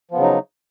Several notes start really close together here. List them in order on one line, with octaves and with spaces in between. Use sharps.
F3 B3 C#3 F#3 D#4